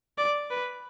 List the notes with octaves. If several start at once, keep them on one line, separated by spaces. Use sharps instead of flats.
D5
B4